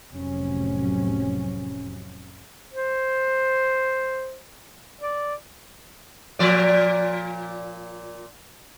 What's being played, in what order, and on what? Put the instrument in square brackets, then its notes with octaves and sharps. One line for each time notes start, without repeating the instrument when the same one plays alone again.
[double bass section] F1 A2 C3 F#3 C#4
[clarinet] C5
D5
[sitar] A#2 F3 D5